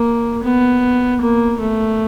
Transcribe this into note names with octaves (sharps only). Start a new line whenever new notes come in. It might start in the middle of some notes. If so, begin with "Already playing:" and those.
Already playing: A#3
B3
A#3
A3